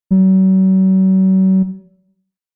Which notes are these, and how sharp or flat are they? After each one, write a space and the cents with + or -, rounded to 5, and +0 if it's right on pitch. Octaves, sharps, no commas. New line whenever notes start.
F#3 +40